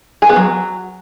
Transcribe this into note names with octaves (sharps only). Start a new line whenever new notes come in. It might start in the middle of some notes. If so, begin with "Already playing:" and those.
G#4
B3
F#3